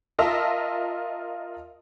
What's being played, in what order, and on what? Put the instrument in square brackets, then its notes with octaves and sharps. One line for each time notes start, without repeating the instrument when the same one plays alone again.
[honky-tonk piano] F4 A#4 D#5 E5 A5 E6